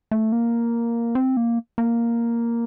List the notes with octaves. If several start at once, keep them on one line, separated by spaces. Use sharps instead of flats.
A3
A#3
C4
A#3
A#3